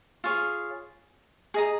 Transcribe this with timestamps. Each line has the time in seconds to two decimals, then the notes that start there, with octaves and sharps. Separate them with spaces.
0.24 F4 G#4 C#5 F5
1.54 G#4 D#5 A#5